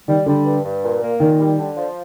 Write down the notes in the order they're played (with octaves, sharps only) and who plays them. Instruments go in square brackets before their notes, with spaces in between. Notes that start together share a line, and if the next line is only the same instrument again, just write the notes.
[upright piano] D#3 [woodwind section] G3
[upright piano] D3 [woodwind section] G3
[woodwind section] G2
G2
A#2
A#3
[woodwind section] A#2 [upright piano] D#3
[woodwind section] G3
D3
F3